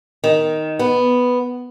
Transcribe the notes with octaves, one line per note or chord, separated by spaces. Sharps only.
D#3
B3